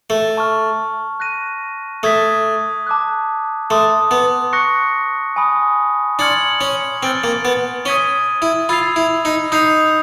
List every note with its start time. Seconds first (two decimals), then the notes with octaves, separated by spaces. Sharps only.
0.10 A3
0.37 A5 C#6 F6
1.20 F#6 A#6 D#7
2.03 A3 D#6 G#6 B6
2.87 A5 D6 F#6
3.70 A3 A5 C6 D#6
4.11 B3
4.53 C#6 F#6 A#6 C#7
5.36 G#5 B5 D#6
6.19 D4 C6 F6 G#6 C#7 F#7
6.61 C#4
7.03 C4 F6 A6 D7 G7
7.24 A#3
7.45 B3
7.86 C#4 D#6 G#6 B6 D#7 G7
8.42 E4
8.69 F4 B5 E6 G#6 C7 F7
8.96 E4
9.25 D#4
9.52 D#4 D#6 G6 C7 F7